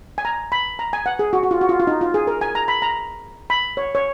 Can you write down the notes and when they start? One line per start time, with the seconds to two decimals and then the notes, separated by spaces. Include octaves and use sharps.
0.18 G#5
0.25 A#5
0.52 B5
0.79 A#5
0.93 G#5
1.06 F#5
1.19 G#4
1.33 F#4
1.43 F#4
1.51 F4
1.61 F#4
1.69 F4
1.80 F4
1.87 D#4
2.01 F4
2.14 G#4
2.27 A#4
2.41 G#5
2.55 A#5
2.68 B5
2.82 A#5
3.50 B5
3.77 C#5
3.95 C#5